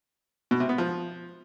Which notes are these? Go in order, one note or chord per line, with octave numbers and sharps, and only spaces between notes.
B2
C3
B3
F3